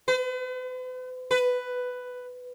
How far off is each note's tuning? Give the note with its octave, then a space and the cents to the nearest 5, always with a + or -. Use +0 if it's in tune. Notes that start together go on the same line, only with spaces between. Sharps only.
B4 +45
B4 +10